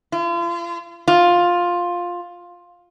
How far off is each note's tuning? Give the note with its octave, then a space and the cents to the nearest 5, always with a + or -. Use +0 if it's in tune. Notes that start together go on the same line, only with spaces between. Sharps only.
F4 -40
F4 +10